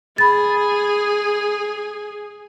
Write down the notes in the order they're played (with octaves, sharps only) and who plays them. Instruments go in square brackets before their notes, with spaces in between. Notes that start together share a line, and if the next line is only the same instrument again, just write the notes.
[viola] G#4 [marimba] B5 A6